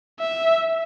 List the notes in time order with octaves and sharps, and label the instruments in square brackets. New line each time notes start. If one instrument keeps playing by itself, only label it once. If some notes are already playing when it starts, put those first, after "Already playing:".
[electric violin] E5